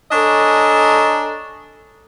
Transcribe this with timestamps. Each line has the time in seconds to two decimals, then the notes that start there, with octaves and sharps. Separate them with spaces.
0.12 D4 A4 C#5 D#5 G#5 A#5